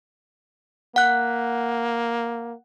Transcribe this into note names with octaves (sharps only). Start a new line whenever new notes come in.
A#3 F#5 F#6